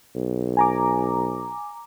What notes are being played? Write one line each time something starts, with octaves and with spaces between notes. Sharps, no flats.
B1
G#5 A#5 D6